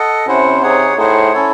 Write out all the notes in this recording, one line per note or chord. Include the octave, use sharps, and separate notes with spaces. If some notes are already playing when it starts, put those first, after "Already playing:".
Already playing: A4 D#5 F#5
C3 C#4 E4 C5 F#5
D#4 G#4 C#5 F#5
A2 D#4 G#4 C5 F#5
C#4 E4 A4 C#5